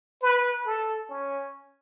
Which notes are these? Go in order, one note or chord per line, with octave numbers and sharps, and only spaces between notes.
B4
A4
C#4